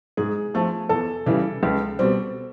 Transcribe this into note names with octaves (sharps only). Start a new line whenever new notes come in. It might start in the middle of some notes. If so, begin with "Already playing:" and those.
G#2 G#4
F3 A3 C4
E2 A4
C#3 E3 G3
C#2
B2 G3 C4